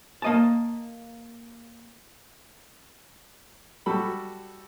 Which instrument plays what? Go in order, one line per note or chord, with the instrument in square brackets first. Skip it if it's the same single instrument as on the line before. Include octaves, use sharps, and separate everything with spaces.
[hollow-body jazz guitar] A#3 D#5 A5
[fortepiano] G3 F#4 A4 B5